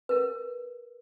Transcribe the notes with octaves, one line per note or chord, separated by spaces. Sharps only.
A#4 B4